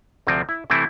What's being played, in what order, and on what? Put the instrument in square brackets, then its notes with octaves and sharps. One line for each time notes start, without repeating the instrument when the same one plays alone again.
[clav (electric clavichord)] D2 C3 F3 C4
E4
C3 E3 A3 C4 E4